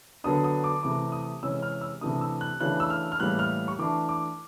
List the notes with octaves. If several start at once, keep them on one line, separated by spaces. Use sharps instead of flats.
D3 F#3 B3 D4 D#6
D#6
D6
C3 E3 A3 D6
D#6
C3 E3 G#3 C#4 E6
F6
E6
C3 E3 A3 D4 D#6
E6
F#6
C#3 E3 A3 D4 F#6
E6
F6
F6
A2 E3 G3 A#3 F#6
F6
C#6
E3 A3 D4 D6
D6